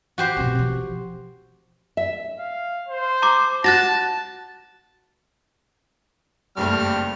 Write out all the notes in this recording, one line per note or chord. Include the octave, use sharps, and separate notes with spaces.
F#4 G4 C5
B2 C4
E3 F3
E5
F5
C5
A#5 D6
F#4 A5 F#6 A6 A#6
F#1 G2 G3 A3 C4 F6